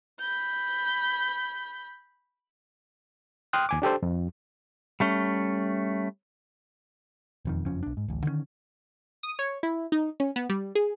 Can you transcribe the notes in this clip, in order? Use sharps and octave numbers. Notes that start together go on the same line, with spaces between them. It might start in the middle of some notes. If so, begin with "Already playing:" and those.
B5 G6
G5 C6 D#6 F6 F#6
D#2 G#5 D6
D4 G4 A4 C5
F2
G3 A3 C#4
E1 F2 D#3
F#1 F2 F3 C#4
B1 D4
G#2
D1 A1
D3 D#3 G3 C#4
D#6
C#5
E4
D#4
C#4
B3
G3
G#4